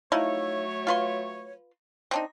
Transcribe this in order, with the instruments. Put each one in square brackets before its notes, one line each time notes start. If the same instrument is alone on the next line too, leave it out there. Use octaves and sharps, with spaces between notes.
[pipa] F3 D#4 E4 [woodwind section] F#3 A3 C#5
[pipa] F4 B4 C6
C4 D4 D#4